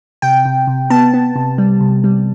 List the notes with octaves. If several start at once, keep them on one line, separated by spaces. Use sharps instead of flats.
C3 G5
C3
C3
B3 A5
B3
C3
G3
C3
G3